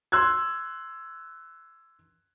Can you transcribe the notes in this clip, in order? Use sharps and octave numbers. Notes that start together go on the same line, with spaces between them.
C6 E6 F#6 G#6